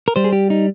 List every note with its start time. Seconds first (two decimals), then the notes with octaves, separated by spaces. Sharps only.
0.08 A#4
0.16 G3 C5
0.24 G#4
0.33 G4
0.50 D#4